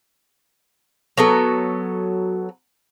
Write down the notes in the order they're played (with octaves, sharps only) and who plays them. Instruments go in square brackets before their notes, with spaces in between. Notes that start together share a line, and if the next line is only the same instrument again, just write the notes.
[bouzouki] F#3 B3 A4